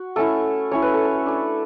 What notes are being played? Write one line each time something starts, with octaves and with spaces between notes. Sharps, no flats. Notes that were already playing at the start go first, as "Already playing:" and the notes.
Already playing: F#4
A3 C#4 E4 A4
A3 C#4 E4 C#5
B4
A4
B4
A3 D4